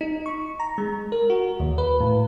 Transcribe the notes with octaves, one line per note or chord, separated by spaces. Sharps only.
D#4
C#6
A#5
G#3
A#4
F#4
D#2
B4
A2